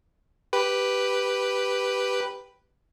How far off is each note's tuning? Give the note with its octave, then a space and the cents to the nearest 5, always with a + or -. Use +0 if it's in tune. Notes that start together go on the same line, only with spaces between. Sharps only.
G4 +0 B4 +0